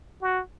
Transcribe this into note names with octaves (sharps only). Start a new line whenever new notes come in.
F#4